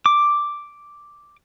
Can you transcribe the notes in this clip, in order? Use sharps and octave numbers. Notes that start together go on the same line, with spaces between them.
D6